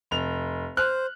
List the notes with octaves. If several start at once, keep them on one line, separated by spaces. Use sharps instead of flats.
F1 F7
C5 F6 F#6